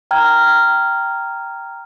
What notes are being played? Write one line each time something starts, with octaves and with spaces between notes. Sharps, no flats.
G5 A#5 F6 G#6